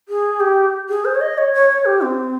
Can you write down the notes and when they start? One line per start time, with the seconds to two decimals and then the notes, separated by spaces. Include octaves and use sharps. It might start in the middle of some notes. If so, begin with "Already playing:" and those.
0.09 G#4
0.40 G4
0.89 G#4
1.05 C5
1.15 C#5
1.21 D#5
1.38 C#5
1.54 C#5
1.69 C#5
1.85 G4
2.02 C4